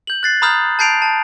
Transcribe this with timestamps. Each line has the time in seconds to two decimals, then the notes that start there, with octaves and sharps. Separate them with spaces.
0.07 G6 F#7
0.23 F#6 A6 C7
0.42 A#5 B5 D#6 F6 G6
0.79 A5 G6 C7 D7 F7
1.02 A5